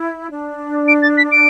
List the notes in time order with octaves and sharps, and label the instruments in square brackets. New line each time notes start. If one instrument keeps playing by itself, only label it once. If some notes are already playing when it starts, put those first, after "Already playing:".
Already playing: [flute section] E4
D4
[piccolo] D7
A6
B6
D7